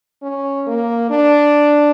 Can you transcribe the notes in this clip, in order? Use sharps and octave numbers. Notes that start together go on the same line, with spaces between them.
C#4
A#3
D4